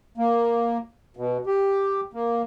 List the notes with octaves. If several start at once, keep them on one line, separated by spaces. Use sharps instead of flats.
A#3
B2
G4
A#3